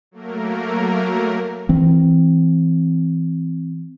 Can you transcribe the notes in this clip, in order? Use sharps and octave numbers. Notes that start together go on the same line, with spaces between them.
F#3 A3 A#3 A#4
E3 C4